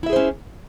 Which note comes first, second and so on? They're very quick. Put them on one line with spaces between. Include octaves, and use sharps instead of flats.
E4 E5 G#4 C5 C#4